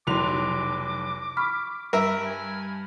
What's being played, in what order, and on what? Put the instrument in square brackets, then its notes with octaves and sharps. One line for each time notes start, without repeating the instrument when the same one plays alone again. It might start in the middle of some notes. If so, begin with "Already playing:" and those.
[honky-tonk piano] F1 B1 F7 [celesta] E4 C6 [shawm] D6
[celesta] B5 C#6 F6 [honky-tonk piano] B6
[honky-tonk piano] G2 [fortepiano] A#4 E5
[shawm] G#5